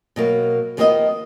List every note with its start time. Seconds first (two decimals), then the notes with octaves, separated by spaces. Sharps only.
0.16 B2 F#3 A#3
0.77 D#2 F3 A#3 B3 C5 D#5